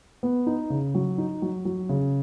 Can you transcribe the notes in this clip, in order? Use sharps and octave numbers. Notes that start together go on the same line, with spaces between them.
B3
D#4
C#3
F#3
D#4
F#3
F#3
C#3